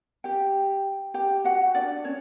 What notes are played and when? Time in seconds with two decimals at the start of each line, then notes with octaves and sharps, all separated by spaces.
0.24 G4 G5
1.14 G4 G5
1.44 F#4 F#5
1.74 D4 D5
2.04 C#4 C#5